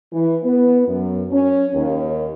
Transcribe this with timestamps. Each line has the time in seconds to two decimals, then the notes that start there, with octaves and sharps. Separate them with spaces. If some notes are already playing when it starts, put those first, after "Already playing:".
0.12 E3
0.43 B3
0.88 F#2
1.31 C#4
1.74 D#2